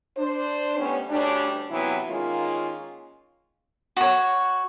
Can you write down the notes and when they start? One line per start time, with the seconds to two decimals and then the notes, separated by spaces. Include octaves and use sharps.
0.17 D4 C5
0.77 A2 G3 B3 C#4
1.10 D2 G3 C#4 D4
1.70 C3 E3 F#3 B3 E4
2.09 D#3 G#3 A#3 C#4 F4
3.96 F#4 C#5